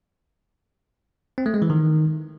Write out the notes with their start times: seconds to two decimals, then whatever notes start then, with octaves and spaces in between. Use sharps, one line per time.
1.38 C4
1.46 A3
1.54 G#3
1.62 E3
1.70 D#3